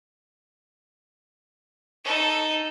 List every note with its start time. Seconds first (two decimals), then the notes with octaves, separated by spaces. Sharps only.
2.05 D#4 A4